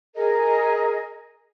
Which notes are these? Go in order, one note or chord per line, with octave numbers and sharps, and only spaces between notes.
G#4 A#4 D#5